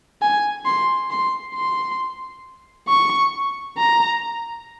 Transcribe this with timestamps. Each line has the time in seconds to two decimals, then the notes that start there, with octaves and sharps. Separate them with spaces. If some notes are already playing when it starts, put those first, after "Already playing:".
0.22 G#5
0.66 C6
1.11 C6
1.54 C6
2.88 C#6
3.78 A#5